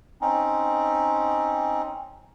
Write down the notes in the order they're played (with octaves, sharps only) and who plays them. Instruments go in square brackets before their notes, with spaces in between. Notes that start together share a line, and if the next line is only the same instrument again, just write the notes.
[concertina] C4 C#4 D#4